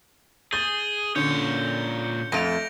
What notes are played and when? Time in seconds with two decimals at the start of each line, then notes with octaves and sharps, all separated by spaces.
0.53 G#4 G6 A6 G7
1.16 A#2 D3 C#4 C#5 G6 C#7
2.32 F2 A3 A#6 D7 F7